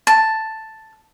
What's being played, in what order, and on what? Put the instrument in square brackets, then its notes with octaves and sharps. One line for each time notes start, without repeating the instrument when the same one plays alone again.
[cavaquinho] A5